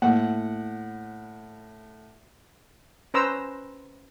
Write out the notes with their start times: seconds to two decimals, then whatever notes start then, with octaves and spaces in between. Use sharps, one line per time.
0.02 A2 A#3 F#5
3.14 C#4 B4 C5 A#5 E6